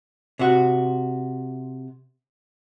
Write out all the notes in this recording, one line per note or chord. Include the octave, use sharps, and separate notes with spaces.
C3 F#4